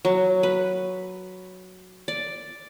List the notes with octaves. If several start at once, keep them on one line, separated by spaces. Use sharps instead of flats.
F#3
B4
D5